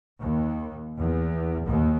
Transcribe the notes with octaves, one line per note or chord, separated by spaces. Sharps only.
D#2
E2
D#2